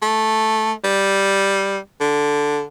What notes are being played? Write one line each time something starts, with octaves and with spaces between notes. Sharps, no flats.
A3
G3
D3